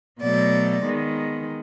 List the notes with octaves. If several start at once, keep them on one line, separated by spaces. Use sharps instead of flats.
B2 F#3 A3 D5
D#3 G#3 B3